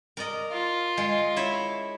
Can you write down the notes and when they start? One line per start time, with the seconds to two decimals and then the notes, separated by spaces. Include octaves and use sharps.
0.17 A#4 D5 D#5
0.51 F4
0.97 G#3
1.36 E4 C#5 E5